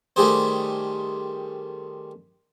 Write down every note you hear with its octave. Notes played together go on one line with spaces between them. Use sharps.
D#3 G3 A3 G4 G#4 C5